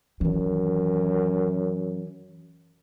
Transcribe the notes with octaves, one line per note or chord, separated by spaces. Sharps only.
F#2 D#3 E3